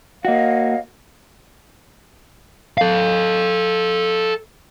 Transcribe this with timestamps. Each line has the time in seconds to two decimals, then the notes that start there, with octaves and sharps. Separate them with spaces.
0.25 A#3 F#4 C#5 D#5 F5
2.78 A4 F5